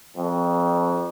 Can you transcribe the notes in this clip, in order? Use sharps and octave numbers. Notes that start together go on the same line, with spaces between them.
F2